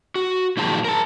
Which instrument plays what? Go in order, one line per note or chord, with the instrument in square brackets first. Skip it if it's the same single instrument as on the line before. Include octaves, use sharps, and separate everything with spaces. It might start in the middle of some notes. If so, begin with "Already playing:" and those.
[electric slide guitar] F#4
A#2 D#3 F3 F#3 G#3 A5
A#4 A5